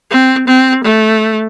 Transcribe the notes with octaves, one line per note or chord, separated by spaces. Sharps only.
C4
C4
A3